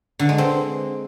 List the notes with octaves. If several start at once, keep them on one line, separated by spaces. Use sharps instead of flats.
D3
G#3
C4